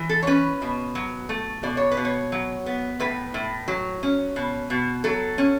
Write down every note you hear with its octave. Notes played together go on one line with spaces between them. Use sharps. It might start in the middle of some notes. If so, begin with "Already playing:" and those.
Already playing: E3
A4
C#5
C#4 B4
B2
F#3
A3
B2 D5
C#5
B4
B2
C#5
F#3
B3
A2 B4
A2
F#3
C#4
B2
B2
F#3 A4
C#4